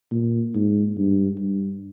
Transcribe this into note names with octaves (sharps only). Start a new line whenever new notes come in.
A#2
G#2
G2
G2